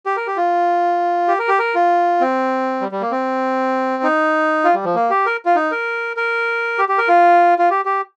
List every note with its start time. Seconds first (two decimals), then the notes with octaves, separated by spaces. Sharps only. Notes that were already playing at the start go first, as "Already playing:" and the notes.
0.06 G4
0.17 A#4
0.27 G4
0.37 F4
1.28 G4
1.39 A#4
1.48 G4
1.59 A#4
1.75 F4
2.21 C4
2.81 G3
2.92 G3
3.01 A#3
3.11 C4
4.03 D#4
4.64 F4
4.74 G3
4.85 F3
4.95 A#3
5.10 G4
5.26 A#4
5.45 F4
5.55 D#4
5.71 A#4
6.17 A#4
6.78 G4
6.89 G4
6.98 A#4
7.08 F4
7.58 F4
7.70 G4
7.85 G4